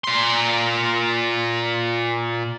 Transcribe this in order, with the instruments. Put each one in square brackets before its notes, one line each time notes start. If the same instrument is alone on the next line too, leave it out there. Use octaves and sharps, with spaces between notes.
[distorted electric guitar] A#2 C6